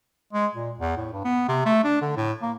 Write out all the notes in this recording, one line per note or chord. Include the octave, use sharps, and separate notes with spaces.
G#3
A#2
E2
A2
G2
B3
C3
A3
D4
D3
A2
A#3